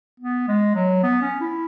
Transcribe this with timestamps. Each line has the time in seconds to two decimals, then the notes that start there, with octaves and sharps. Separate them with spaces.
0.20 B3
0.48 G#3
0.75 F#3
1.03 B3
1.22 C#4
1.41 E4